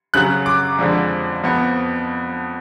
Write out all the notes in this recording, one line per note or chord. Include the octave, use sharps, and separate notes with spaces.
F#2 C#3 F#3 F#6
D6
F2 D3 F3 G#3
F2 F3 B3